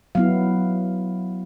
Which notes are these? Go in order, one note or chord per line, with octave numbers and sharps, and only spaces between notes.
F#3 B3 E4 F5